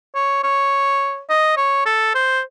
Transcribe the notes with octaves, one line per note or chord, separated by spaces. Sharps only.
C#5
C#5
D#5
C#5
A4
C5